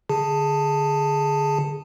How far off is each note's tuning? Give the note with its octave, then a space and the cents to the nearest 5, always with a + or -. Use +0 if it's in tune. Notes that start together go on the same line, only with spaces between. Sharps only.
D3 +0 G#4 +0 A5 +10